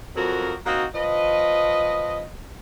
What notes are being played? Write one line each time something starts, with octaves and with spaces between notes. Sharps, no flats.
F2 F3 F#3 F#4 A#4
A#3 C4 D#4 F#4
F3 B4 D#5